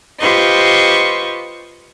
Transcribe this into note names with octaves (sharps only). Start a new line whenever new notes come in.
F4 G4 B4 C5 D#5 C#6